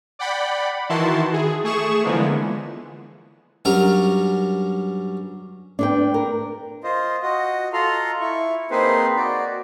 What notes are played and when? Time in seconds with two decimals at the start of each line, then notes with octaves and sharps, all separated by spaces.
0.19 D5 F#5 G5 B5
0.89 D#3 E3 E4 F#4 A5 C6
1.33 G#4
1.64 A3 G#4 C#6 E7
2.03 D3 E3 F3 G#3 A#3 B3
3.65 G2 F#3 C#4 A#4 A#5
5.79 D4 B4 G5
6.14 A#4
6.84 F4 C5 D#5
7.22 F#4 D#5
7.73 F4 A4 A#5 C6
8.20 E4 C#6
8.71 A#3 C4 D#4 G#4 B4 C5
9.17 F#4 D5